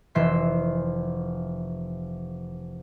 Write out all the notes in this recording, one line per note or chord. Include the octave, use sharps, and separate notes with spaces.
F1 E3 E5 C6